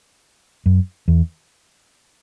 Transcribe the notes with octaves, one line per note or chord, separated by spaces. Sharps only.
F#2
E2